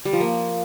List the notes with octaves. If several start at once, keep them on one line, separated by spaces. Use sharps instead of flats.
G3
F3
A#3